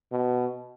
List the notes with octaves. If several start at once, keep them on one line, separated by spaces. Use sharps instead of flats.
B2